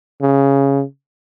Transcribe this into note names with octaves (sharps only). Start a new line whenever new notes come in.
C#3